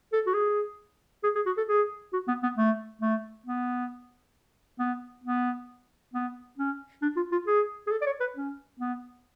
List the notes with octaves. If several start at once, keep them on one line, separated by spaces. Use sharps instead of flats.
A4
F#4
G#4
G#4
G#4
F#4
A4
G#4
F#4
B3
B3
A3
A3
B3
B3
B3
B3
C#4
D4
F4
F4
G#4
G#4
A4
D5
C#5
B4
C#4
B3